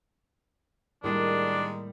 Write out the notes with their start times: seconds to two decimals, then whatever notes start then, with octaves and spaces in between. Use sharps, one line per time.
1.04 A2 D#3 G3 G#3 A#3 D4